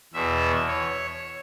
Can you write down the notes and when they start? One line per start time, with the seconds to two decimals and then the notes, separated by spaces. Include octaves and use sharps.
0.13 E2 B2 E5
0.68 C#5